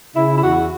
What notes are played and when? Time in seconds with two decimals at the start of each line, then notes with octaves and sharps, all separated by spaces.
0.16 C#3 E4
0.37 E4
0.42 E2 F#4